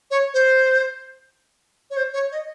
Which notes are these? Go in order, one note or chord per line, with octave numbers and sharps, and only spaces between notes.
C#5
C5
C#5
C5
C#5
D#5